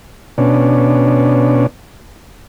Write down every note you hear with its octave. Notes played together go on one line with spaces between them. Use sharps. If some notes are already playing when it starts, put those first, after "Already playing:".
B2 C#4 D4